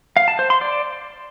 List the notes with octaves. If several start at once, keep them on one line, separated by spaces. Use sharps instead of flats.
F5
A5
C5
C6
D5